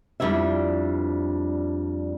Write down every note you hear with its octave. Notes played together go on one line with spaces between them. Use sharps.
F2 G3 D4 E4 E5